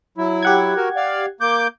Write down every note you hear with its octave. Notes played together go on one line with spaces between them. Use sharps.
F#3 E4
G4 F#5 G#6
F#4 A#4
D5 F5
A#3 D6 G6